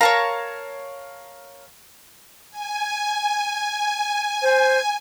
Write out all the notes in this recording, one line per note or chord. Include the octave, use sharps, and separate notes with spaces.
A#4 C#5 F5 A5 A#5
G#5
C5